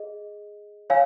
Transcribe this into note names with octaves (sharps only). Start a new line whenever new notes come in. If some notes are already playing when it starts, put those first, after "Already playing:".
Already playing: G#4 D#5
C#5 F5 G#5